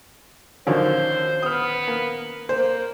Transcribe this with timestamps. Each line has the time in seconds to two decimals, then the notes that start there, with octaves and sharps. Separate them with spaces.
0.67 D3 D#3 F3 F#3 C#4 C5
1.43 B3 D#6 F6
1.87 A#3
2.49 A#3 C5